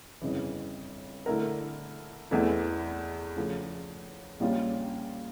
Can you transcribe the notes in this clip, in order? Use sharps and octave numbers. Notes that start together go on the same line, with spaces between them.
G1 F2 C#3 E3
D3 A3 E4 A#4
E2 E3 A3 E4
C#3 F3 A3
A#1 A#2 G3 C#4 F4